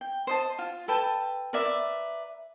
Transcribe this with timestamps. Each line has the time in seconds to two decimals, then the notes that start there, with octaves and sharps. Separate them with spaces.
0.01 G5
0.27 C5 D#5 A5
0.59 F4
0.88 A4 B4 G5 A5
1.53 A#4 B4 D5 E5